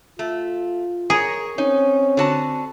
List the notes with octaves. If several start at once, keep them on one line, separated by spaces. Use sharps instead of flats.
A3 F4
G#4 A#4 C#5
C4 C#4 D#4
D3 F#4 A5